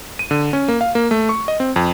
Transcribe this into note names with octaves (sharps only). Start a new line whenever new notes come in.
D#7
D3
C#4
A#3
F5
A#3
A3
C#6
D#5
C4
F2